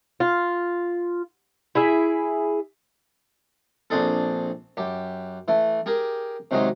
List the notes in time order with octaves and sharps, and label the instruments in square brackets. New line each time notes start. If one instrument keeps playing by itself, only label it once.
[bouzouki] F4
E4 G#4 E5
[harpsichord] A#1 C4 D4 G#4 A4
F#2 G4
E3 A3
G4 G#4 A#4
C3 D#3 F#3 G#3 D#4